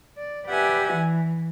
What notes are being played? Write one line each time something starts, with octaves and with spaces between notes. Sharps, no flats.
D5
G4 B4 D5 E5 F#5 G#5
E3